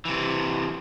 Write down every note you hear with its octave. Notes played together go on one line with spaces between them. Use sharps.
C3 E3